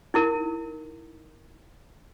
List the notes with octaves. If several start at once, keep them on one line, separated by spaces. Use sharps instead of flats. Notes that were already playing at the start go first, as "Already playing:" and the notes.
D#4 E4 A#4